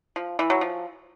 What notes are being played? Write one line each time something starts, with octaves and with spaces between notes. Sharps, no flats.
F3
E3
F#3
F3